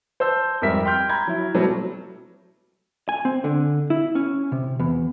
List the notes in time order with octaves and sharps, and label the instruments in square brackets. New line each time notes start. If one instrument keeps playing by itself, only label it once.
[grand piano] C5 A5 E6 G6
F2 G#2 G3 A#4 E5 B6
G5 C6 F6 G6
A#5 B5 G#6
F#3 E4
B2 F#3 G3 A3 C4
[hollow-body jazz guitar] G#5
C4
D3
E4
C#4
C3
E2